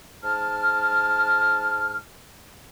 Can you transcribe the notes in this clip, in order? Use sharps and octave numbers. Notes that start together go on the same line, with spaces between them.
G#2 A5 F6